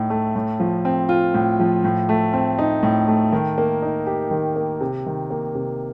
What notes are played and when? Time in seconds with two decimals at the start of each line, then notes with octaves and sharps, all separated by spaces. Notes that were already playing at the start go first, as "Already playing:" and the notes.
Already playing: A2 D#4
0.10 A3
0.35 A2
0.60 F3
0.85 C4
1.09 F4
1.34 A2
1.59 F3
1.84 A2
2.09 A3
2.33 C4
2.59 D#4
2.83 A2
3.08 A3
3.32 D#3
3.58 A#3
3.82 D#4
4.07 G4
4.31 D#3
4.56 A#3
4.80 C3
5.06 D#3
5.30 A#3
5.55 C3